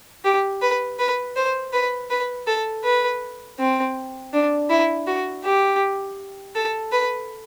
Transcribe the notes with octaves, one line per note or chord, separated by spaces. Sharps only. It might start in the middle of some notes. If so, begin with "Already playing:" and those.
G4
B4
B4
C5
B4
B4
A4
B4
C4
D4
E4
F#4
G4
A4
B4